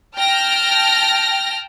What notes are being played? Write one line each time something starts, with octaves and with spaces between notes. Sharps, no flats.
G5 A5 F6 A#6